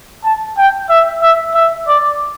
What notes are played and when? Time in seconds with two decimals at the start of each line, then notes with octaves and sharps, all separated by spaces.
0.24 A5
0.58 G5
0.90 E5
1.22 E5
1.55 E5
1.88 D5